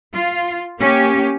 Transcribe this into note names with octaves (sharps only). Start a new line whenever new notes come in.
F4
A#3 C#4 G4